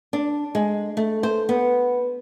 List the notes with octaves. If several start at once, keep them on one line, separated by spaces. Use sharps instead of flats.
D4
G#3
A3
C5
B3